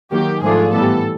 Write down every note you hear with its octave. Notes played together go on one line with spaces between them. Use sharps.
D#3 F#3 A#3 G4
G#2 F3 A3 D4 F4 G#4
A2 E3 G3 B3 A4